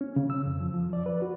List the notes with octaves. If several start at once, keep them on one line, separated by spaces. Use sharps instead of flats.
C#4
C#3
E6
F2
F3
F3
D5
B4
F#4